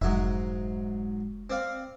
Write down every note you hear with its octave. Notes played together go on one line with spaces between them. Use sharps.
F1 G#2 F#3 E5
C4 D5 F5